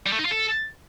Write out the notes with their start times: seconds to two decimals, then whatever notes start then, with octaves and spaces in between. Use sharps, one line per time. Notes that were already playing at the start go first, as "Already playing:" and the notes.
0.07 G3
0.13 A3
0.19 D#4
0.25 F4
0.32 A4